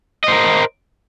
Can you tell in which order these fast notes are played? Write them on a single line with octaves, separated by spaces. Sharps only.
D#5 C5 A#4